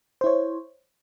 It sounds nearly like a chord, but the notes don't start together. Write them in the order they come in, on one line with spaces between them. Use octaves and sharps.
C5 E4 C#5